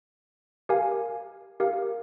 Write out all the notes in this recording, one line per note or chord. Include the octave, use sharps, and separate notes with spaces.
G4 A#4 F5 G#5
G4 A#4 F5